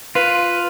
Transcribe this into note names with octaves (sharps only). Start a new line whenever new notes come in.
F4 B4